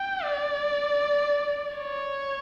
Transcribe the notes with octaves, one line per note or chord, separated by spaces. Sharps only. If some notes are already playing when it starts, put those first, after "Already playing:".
Already playing: G5
D5
C#5